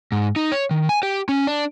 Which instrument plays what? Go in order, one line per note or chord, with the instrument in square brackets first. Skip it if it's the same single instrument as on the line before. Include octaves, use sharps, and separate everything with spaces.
[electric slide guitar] G#2
D#4
C#5
D#3
G#5
G4
C#4
D4